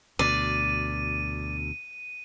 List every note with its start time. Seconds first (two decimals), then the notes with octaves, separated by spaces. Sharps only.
0.19 D2 B2 D5 D#7